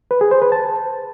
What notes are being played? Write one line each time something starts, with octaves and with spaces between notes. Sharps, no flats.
B4
G#4
C5
B4
A5